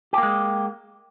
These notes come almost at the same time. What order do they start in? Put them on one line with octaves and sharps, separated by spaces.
G4 A#3 G#3